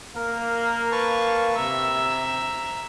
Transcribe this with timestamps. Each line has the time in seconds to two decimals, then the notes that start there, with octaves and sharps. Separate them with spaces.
0.15 A#3 A#4
0.92 B4 A5 C#6
1.57 C3 E5 A#5